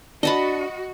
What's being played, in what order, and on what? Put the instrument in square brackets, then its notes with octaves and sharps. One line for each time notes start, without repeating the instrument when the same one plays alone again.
[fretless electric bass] D4 [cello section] F#4 [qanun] D#5 A5 B5